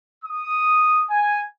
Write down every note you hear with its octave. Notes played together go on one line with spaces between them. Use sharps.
D#6
G#5